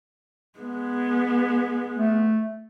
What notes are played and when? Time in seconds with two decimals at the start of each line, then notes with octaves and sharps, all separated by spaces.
0.59 G#3 B3
1.96 A3